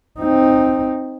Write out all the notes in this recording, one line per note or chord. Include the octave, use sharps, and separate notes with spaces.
C4 D#4